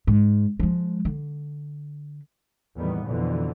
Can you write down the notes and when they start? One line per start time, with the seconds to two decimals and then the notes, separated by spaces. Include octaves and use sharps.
0.07 G#2
0.60 F3 G#3
1.05 D3
2.76 E2 A2 D#3 G3 B3
3.06 F2 B2 D3 E3